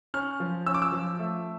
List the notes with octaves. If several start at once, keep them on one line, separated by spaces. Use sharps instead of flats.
C#4 F6
F3
C#4 E6
D6
E6
F3
A3